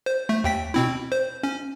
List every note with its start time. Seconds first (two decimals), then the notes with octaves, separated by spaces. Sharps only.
0.06 C5
0.29 A3
0.44 D#2 G5 B6
0.74 B2 C4 E4
1.12 C5
1.43 C#4